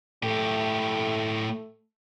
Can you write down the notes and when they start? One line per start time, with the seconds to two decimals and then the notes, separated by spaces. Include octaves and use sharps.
0.23 A2 A3 G4